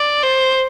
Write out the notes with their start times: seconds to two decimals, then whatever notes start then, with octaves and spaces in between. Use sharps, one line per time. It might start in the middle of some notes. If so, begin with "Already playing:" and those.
Already playing: D5
0.23 C5